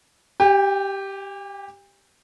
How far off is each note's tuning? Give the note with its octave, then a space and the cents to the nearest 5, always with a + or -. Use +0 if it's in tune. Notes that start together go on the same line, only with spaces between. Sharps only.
G4 -5 G5 +45